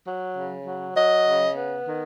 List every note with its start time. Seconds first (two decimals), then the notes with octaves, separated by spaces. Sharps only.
0.06 F#3
0.37 C#3
0.66 F#3
0.96 F#3 D#5
1.26 C#3
1.56 B3
1.85 D#3